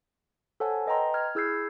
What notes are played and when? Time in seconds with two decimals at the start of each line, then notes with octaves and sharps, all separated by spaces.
0.60 A4 C5 C#5 F#5 G#5 A5
0.86 B4 D#5 G5 A#5 C6
1.14 F6 G#6
1.35 E4 G#4 E6 G6 G#6 C7